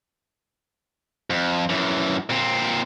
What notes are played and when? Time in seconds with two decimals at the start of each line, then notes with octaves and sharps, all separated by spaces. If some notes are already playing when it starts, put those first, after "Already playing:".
1.30 F2
1.70 F#2 E3
2.30 A#2 C4